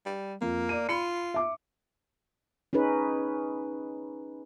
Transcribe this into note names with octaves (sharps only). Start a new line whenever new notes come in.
G3
F2 A#3
D5 D#7
F4 B5 C#7
E5 D6
C#4 D#4 G#4 B4